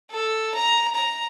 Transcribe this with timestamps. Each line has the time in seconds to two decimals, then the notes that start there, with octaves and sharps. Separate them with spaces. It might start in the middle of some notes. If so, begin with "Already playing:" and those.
0.11 A4
0.55 A#5
0.95 A#5